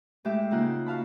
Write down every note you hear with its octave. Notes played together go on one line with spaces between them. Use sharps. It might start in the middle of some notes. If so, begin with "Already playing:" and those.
A2 G#3 G4 E5
C#3 A#3 D#4 F4 F#5
F#4 F5 A5 B5